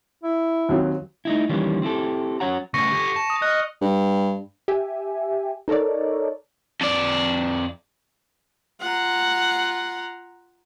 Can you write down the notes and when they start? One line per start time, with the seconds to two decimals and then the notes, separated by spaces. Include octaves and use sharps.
0.23 E4
0.69 D#2 F#3 C4
1.25 A3 D#4 E4
1.49 D#3 E3 G3 A#3 C#4
1.82 C4 E4 G4 A4
2.40 F#3 C#4 C#5 F#5 A#5
2.74 C#3 A3 C#6 A#6 C#7
2.92 G4 A4
3.16 A5
3.30 D#6
3.42 D#5 F6 F#6
3.81 G2
4.68 G4 E5 G#5
5.68 D#4 A4 A#4 C#5 D5
6.81 F2 D5
8.81 F4 F#5 A#5